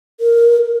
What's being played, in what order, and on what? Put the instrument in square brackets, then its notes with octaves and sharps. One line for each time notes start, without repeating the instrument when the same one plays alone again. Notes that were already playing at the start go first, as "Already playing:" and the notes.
[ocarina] A#4